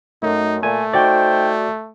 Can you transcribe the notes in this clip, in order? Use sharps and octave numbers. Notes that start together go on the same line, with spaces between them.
F#2 A3 D#4
A#2 A3 G#5
D#4 F#4 C5 D5 G5